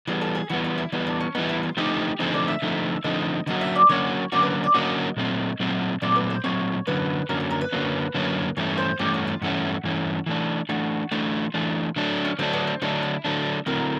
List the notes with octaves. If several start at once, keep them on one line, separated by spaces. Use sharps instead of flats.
E3 G3 B3 G#4
A4
G#4
E3 G3 B3 F#4
F4
E4
E3 G3 B3 D#4
D4
C#4
E3 G3 B3 D#4
E4
F4
D3 F3 A3 C4 D#4 G4
D3 F3 A3 C4 D#4 G#4
D5
E5
D3 F3 A3 C4 D#4
D3 F3 A3 C4 D#4 D#5
D3 F#3 A#3 C#4 F#4 D#5
E5
D5
D3 F#3 A#3 C#4 F#4 C#5
D3 F#3 A#3 C#4 F#4 D5
B4
D5
D3 F#3 A#3 C#4 F#4 D#5
A#2 F#3 A3 C4
A#2 F#3 A3 C4
A#2 F#3 A3 C4 D5
B4
C5
A#2 F#3 A3 C4 C#5
F#2 D3 F#3 A#3 C#4 B4
F#2 D3 F#3 A#3 C#4 A#4
A4
A#4
B4
F#2 D3 F#3 A#3 C#4
F#2 D3 F#3 A#3 C#4
G2 E3 A3 C#4 C#5
C5
G2 E3 A3 C#4 G4
F#4
F4
G2 E3 A3 C#4 F#4
G2 E3 A3 C#4
E3 A3 D4
E3 A3 D4 F#4
E3 A3 D4 F4
E3 A3 D4
D3 F#3 A3 D4
C#4
D3 F#3 A3 C4 D4
B3
C4
D3 F#3 A3 D4 D#4
E4
D3 F#3 A3 D4
D3 F#3 A3 C4 E4 A#4